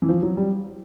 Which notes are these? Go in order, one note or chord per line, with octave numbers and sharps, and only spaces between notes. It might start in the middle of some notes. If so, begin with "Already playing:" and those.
E3
F3
F#3
G3